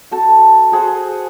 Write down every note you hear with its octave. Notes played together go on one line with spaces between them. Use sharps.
F#4 A4 A5
F#4 G#4 C5 F#5